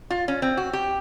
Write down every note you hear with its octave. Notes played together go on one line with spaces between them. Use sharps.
F4
C#4
C4
F#4
G4